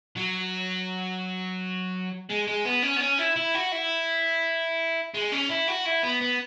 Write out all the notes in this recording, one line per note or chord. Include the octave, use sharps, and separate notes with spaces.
F#3
G#3
G#3
B3
C#4
B3
C#4
E4
E4
F#4
E4
G#3
C#4
E4
F#4
E4
B3
B3